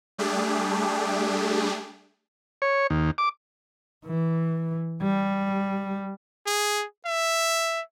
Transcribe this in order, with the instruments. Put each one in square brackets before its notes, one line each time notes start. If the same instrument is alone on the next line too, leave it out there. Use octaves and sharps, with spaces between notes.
[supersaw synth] G3 A3 D4 G4 G#4
[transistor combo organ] C#5
D#2
D6
[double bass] E3
G3
[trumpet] G#4
E5